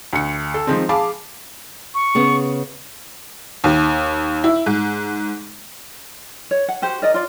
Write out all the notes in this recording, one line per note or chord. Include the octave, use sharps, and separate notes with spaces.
D2 C#7
A4
D#3 F3 G#3 C4
G#4 F5 A5 B5 D6
C#6
C#3 B3
D#2
E4
G#2
C#5
F#5
F#4 G4 C5
A#4 D5 D#5
F4 D5